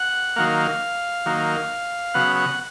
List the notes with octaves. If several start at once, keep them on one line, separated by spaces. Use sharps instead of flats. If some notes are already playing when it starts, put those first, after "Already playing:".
Already playing: F#5
D#3 F#3 A#3 F5
D#3 F#3 A#3
C#3 F#3 B3 F#5
F#5